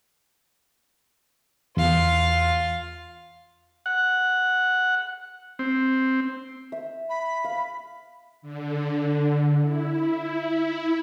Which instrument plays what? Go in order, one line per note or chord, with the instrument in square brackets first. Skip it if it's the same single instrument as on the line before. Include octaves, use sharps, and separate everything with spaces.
[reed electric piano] E2 [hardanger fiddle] F4 F5
[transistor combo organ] F#5
C4
[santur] E5
[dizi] B5
[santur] F5
[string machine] D3
E4